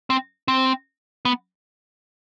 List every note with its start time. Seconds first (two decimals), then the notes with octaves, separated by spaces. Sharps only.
0.10 C4
0.48 C4
1.25 B3